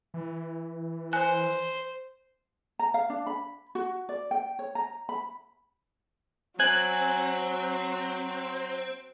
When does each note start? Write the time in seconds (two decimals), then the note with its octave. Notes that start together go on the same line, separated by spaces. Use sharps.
0.14 E3
1.13 C5 G#5 F#6
2.79 A#5
2.94 F5
3.10 D4
3.27 B5
3.75 F#4
4.09 D5
4.31 G5
4.59 C#5
4.75 A#5
5.09 B5
6.60 F#3 C4 G#5 F#6